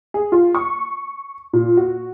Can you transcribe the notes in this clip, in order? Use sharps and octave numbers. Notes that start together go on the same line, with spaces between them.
G#4
F4
C#6
A#2
F#4